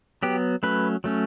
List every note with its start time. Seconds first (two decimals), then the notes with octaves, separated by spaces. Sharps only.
0.23 F#3 B3 G4
0.63 F#3 A3 C#4 B4
1.04 F#3 A3 C#4